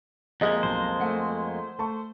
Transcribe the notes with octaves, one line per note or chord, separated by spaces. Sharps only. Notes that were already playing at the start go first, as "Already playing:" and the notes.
F2 G#3 A#3 G4 G#4 D#5
B1 C5
A3 F#5 C#7
A3 A5 C#6